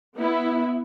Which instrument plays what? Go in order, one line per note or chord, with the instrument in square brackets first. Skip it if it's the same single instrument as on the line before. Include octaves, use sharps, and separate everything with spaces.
[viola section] B3 E4